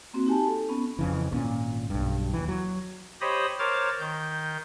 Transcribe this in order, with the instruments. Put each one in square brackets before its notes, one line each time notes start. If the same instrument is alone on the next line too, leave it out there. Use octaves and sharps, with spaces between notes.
[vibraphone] A#3 C4 F#4
D#4 G4 G#5 A5
A4
B3 C#4
[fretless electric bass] F2 C#3 E3
G#1 G2 A#2 C#4
B1 G2
D#2 E3
F#3
[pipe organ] G4 C5 C#5 D#5 B5 D#6
A#4 C5 C#5 D6 F6 A6
D#3 G6